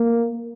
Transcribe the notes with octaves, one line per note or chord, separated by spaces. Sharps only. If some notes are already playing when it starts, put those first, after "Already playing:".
Already playing: A#3